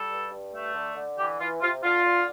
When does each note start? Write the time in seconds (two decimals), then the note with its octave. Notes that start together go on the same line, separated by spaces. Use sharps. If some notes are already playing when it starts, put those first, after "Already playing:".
Already playing: G3 A4
0.10 G2
0.30 G2
0.52 A3
0.74 D3
0.96 D3
1.17 E3 G4
1.39 E3 F4
1.61 C3 F4
1.82 D3 F4
2.04 D3